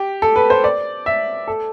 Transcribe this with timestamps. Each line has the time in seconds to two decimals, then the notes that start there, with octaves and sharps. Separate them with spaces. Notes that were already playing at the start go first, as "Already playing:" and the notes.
Already playing: G4
0.22 A4
0.36 B4
0.50 C5
0.64 D5
1.06 E5
1.48 A4